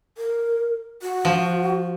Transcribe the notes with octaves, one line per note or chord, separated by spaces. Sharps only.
A#4
F#4
F3